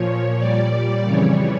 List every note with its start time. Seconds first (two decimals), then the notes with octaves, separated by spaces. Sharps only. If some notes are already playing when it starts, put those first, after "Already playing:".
Already playing: A#2 F3 C#5
0.38 A#2 G3 D5
1.05 F2 C#3 E3 G3 C#5